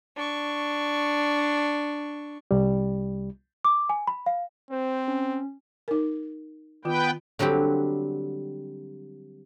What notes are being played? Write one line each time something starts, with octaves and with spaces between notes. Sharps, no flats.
D4 C#6
C2 G3
D6
G#5
B5
F5
C4 C5
C#4
D#4 A#4
D#3 B3 F4 B4 G5
D3 F#3 G3 C4 G4